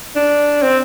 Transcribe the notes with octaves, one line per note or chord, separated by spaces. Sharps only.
D4
C4